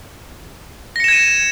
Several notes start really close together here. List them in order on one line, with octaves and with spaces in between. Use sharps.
A#6 C#7 E7 G#6 D#7